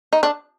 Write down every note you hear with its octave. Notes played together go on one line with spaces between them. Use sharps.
D#4
D4